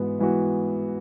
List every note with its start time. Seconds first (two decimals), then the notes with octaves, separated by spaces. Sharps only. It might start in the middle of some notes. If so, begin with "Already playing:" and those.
Already playing: G#2 E3 B3 F#4
0.19 G#2 E3 B3 F#4